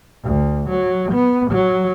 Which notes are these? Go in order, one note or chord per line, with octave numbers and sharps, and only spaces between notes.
D2
F#3
B3
F#3